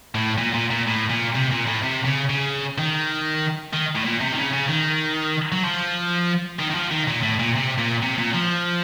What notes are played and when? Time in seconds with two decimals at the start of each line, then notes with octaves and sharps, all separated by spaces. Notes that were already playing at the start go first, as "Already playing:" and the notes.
0.15 A2
0.38 A#2
0.55 A#2
0.71 A#2
0.87 A2
1.10 A#2
1.35 C3
1.51 A#2
1.67 A2
1.83 C3
2.05 C#3
2.30 C#3
2.78 D#3
3.73 D#3
3.95 A2
4.04 A#2
4.21 C3
4.32 D#3
4.37 C#3
4.53 C#3
4.69 D#3
5.52 F#3
5.64 F3
6.59 D#3
6.70 D#3
6.75 F3
6.91 D#3
7.08 A#2
7.23 A2
7.39 A#2
7.55 C3
7.78 A#2
8.03 C3
8.19 A#2
8.34 F3